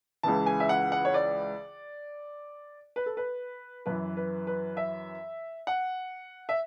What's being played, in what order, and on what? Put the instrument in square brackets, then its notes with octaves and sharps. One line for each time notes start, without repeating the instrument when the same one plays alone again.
[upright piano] C#2 C#3 E3 A5
G#5
E5
F#5
F#5
C#5
D5
B4
A4
B4
F#2 E3 B4
B4
B4
E5
F#5
E5